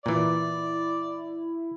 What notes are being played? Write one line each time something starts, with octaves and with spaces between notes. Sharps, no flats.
A#2 E3 E4 D5